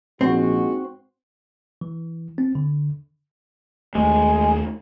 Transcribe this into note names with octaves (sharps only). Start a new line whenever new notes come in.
A#1 G#2 G#3 C4 F#4
E3
C4
D3
D#2 G#3 A3